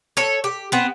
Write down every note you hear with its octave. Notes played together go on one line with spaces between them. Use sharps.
A4 C#5
G4
B3 C4